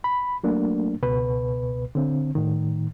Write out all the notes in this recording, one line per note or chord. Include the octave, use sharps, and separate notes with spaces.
B5
F#3 A3 A#3 D4
C#2 B2 B4
D3 C4
A2 D#3